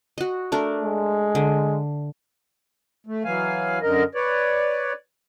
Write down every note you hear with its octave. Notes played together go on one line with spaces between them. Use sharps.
F#4 D#5
A3 D4 A#4
G#3
D3
A3
E3 F#3 F5 G#5
F#2 D3 A#4 D#5
B4 C#5 D5